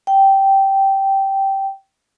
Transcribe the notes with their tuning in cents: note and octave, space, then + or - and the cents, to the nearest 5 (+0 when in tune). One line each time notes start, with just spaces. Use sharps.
G5 -10